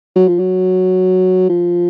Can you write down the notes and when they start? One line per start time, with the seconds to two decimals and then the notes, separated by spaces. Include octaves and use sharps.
0.16 F#3
0.28 F3
0.39 F#3
1.49 F3